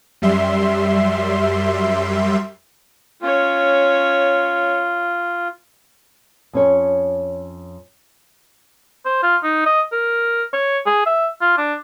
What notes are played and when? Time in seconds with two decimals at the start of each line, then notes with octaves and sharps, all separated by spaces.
0.22 F#2 G3 E5 C6
3.22 C#4 F4 C#5
6.53 F2 C#4 C#5
9.05 C5
9.23 F4
9.43 D#4
9.66 D#5
9.92 A#4
10.53 C#5
10.86 G#4
11.06 E5
11.41 F4
11.58 D4